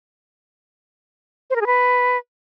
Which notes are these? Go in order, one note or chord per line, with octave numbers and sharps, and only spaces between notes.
C5
A#4
G#4
B4